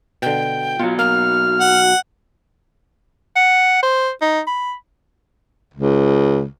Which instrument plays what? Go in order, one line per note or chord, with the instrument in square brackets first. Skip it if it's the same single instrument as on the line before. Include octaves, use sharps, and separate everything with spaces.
[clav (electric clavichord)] B2 D3 [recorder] G5
[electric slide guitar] B2 F#3 [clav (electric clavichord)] F4
[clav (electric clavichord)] A#3 [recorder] F6
[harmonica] F#5
[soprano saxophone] F#5
C5
D#4
B5
[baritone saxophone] C#2